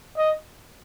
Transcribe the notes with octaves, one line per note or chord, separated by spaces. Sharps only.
D#5